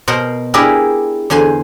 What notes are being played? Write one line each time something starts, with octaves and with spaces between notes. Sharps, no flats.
B2 A#4 C5 F#5 C6
D4 E4 G4 G#4 A#4 B4
E2 D3 C5 G#5 C6